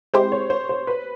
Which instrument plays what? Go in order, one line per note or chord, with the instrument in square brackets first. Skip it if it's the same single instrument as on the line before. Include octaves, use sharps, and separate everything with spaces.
[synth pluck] G#3 C4 E4 G4 [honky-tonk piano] C5
[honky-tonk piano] C#5
C5
C5
B4